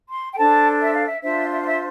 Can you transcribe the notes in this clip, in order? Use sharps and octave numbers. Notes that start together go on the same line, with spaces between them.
C6
G5
D4 A4 C5 A5
E5
F5
E5
D4 F4 C5 E5
E5
F5
E5